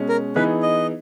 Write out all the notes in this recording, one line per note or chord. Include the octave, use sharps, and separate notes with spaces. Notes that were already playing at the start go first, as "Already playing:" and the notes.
Already playing: B2 G#3 C#4
A#4
E3 B3 D#4 G#4 B4
D#5